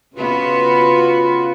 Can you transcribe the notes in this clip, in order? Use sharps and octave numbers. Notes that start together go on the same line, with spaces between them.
C#3 B3 F4 F#4 B4